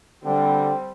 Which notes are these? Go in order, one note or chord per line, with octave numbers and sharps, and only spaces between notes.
D3 G3 C4 G5